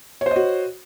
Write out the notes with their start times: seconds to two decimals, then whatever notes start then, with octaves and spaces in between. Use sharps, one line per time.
0.21 C#5
0.26 C5
0.31 D#5
0.36 F#4